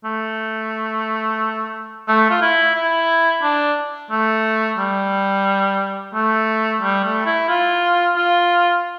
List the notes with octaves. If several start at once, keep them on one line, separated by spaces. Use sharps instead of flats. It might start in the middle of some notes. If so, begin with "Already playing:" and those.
A3
A3
F4
E4
E4
D4
A3
G3
A3
G3
A3
E4
F4
F4